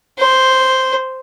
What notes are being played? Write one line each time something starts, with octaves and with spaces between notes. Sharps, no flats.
C5